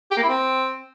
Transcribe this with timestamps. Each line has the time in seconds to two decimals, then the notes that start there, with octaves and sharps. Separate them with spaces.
0.11 G4
0.17 A#3
0.23 E4
0.29 C4